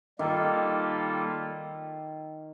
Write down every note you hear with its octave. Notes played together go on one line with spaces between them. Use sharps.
D#3 G3 A#3 F4 A4